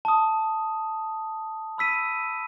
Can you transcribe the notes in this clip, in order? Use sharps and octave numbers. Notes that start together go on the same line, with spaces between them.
A5 D#6
B5 E6 B6 D#7